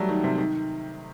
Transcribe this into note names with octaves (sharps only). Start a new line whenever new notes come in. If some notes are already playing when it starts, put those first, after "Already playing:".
Already playing: F#3 G3 A3
D#3
C3
D#3